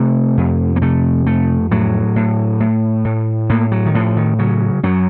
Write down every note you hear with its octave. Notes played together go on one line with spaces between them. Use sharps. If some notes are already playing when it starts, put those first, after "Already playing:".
Already playing: C3 A3
F2
A#3
C3 A3
F2 A3
A2 F#3
A2
A2
A2
A2 A#3
F#3
D#3
A2 F3
D#3
C#3 F#3
F#2 F#3